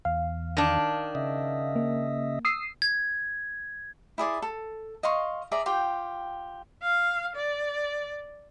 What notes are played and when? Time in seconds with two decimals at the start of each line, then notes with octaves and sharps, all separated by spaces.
0.05 E2 F5
0.57 D#3 D4
1.15 C#3 D#5 E5
1.76 A#3
2.45 D#6 E6 C7
2.82 G#6
4.18 E4 G#4 D5 C6
4.42 A4
5.03 D#5 F5 C6 C#6
5.51 G#4 D5 E5 A#5
5.66 F4 G4 G5
6.82 F5
7.36 D5